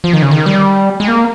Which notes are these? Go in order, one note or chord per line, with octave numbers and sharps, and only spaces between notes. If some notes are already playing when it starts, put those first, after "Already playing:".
F3
D#3
C#3
D#3
G3
G#3
A#3